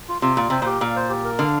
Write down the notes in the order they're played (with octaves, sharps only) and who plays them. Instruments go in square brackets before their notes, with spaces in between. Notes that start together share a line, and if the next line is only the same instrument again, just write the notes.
[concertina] F4
[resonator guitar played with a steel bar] C3 [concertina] F4
[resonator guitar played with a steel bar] A#2 [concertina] F4
[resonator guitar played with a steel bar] C3 [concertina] C5
[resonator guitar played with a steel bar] A#2 [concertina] G4
[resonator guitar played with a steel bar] A#2 [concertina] F5
[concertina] C5
G4
A#4
[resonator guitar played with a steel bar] D3 [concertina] F5